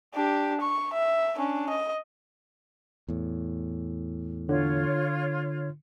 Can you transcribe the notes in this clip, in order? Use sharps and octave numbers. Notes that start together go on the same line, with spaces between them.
D4 G4
C#6
E5
C#4 D4
D#5
E2 A2
D3 F4 C#5